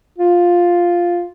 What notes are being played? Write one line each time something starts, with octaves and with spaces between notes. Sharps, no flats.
F4